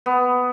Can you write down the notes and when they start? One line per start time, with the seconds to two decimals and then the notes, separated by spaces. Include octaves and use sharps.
0.06 B3